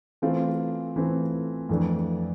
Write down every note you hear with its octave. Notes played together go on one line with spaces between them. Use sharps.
E3 A3 C4 F4
E3 A3 C4 F4
F2 E3 A3 D4